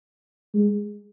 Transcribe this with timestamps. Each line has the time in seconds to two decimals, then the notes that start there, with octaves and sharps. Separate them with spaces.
0.54 G#3